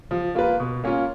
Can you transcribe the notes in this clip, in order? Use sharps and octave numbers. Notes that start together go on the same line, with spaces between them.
F3
A#3 F4 B4
B2
A#3 C#4 F4